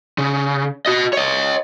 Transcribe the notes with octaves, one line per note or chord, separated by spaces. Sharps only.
C#3
F#4 D#5
C#5 D#5